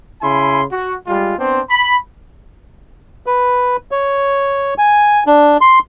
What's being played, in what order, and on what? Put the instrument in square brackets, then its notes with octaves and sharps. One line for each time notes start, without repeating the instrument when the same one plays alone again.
[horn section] C#3 E4 G#5 B5 C6
F#4
G3 G#3 F4
B3 C4 D4 C5
B5
[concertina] B4
C#5
G#5
D4
C6